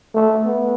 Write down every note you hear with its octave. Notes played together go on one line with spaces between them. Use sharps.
A3
B3